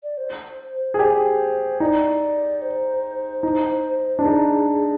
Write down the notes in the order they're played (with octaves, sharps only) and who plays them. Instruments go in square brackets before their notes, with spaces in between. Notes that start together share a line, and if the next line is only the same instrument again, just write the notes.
[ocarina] D5
C5
[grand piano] G#4
[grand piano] G4 [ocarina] D5
[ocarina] C5
[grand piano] D#4 [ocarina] D5
[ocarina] C5
[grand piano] D#4
D4
[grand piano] D#4 [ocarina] G#4